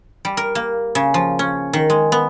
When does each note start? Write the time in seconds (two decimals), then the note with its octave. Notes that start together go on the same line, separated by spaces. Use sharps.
0.25 G3
0.37 A#4
0.55 A#3
0.95 C#3
1.14 F3
1.39 C#4
1.73 D#3
1.90 G#3
2.12 B3